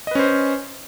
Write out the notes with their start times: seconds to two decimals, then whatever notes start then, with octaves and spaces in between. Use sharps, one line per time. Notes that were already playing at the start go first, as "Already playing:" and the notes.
0.07 D#5
0.11 B4
0.15 C#4
0.19 C5